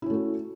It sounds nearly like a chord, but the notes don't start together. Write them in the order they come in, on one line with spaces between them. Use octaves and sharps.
E4 C#4 A3 F#4